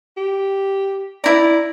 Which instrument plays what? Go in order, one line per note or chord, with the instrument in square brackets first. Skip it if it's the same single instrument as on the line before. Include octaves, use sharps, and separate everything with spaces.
[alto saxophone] G4
[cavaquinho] E4 A#5 [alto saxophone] D5